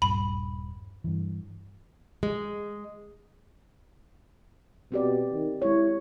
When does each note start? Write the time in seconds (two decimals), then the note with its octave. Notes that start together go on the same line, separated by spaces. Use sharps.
0.02 D#1 G2 B5
1.04 G2 E3
2.23 G#3
4.92 B2 C4 G4 D5
5.33 D#3
5.62 G#3 E4 C#5